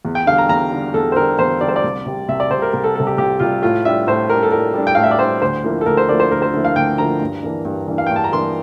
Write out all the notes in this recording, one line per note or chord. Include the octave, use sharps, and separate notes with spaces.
E2
G5
D3 G3 F5
A#5
E2 A#5
D3 G3
E2 A4
C5
D3 G3 A#4
E2 C5
D3 G3 D5
C5
D5
C2
C3 G3
C2 E5
D5
C3 G3 C5
A#4
C2 A#4
A4
C3 G3 A4
G4
C2 G4
C3 G3 F4
A2 F4
G3 D4 E5
A2 C5
G3 D4 A#4
A4
A2 A#4
G3 D4
G5
A2 F5
E5
D5
G3 D4 C5
D2 C5
D3 F3 A#3 E4
A4
D2 A#4
C5
D3 F3 A#3 E4 D5
C5
D2 A#4
C5
D3 F3 A#3 E4
F5
D2 G5
D3 F3 A#3 E4 A#5
G2
E3 A#3 D4
G2
E3 A#3 D4
F5
G5
G2
A5
A#5
E3 A#3 D4 C6